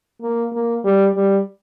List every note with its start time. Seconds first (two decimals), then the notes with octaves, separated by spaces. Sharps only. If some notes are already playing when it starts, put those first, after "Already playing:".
0.22 A#3
0.53 A#3
0.84 G3
1.15 G3